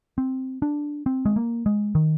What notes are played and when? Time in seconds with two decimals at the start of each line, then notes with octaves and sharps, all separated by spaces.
0.18 C4
0.62 D4
1.06 C4
1.25 G#3
1.36 A#3
1.66 G#3
1.95 D#3